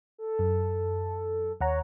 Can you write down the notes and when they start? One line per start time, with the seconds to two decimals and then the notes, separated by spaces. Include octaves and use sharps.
0.18 A4
0.39 F#2
1.61 D#2 C#5 F#5 A#5